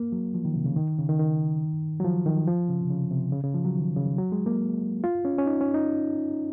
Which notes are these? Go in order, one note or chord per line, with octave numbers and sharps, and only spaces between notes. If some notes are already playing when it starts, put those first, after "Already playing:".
Already playing: A#3
F#3
F3
D#3
C3
C#3
D#3
C#3
D#3
D#3
F#3
F3
D#3
F3
C#3
C3
C#3
C3
C#3
C#3
F3
F#3
D#3
C#3
F#3
G#3
A#3
F4
C#4
C#4
D#4
C#4
D#4